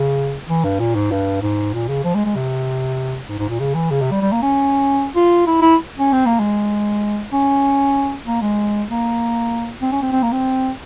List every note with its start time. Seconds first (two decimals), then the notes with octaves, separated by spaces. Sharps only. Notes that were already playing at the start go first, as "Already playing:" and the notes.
Already playing: C#3
0.49 E3
0.64 G2
0.80 A#2
0.95 G#2
1.11 G2
1.42 G#2
1.74 A#2
1.89 C#3
2.04 F3
2.15 G#3
2.25 G#3
2.35 C3
3.29 G#2
3.39 G#2
3.49 A#2
3.60 C#3
3.75 E3
3.91 C#3
4.02 C3
4.11 G3
4.22 G3
4.32 A#3
4.42 C#4
5.15 F4
5.47 E4
5.62 E4
5.98 C#4
6.12 C4
6.26 A#3
6.39 G#3
7.33 C#4
8.26 A#3
8.41 G#3
8.89 A#3
9.82 C4
9.92 C#4
10.02 C4
10.12 C4
10.23 A#3
10.32 C4